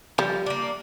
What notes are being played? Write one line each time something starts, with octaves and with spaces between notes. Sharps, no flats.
F3 G3
A#3 D4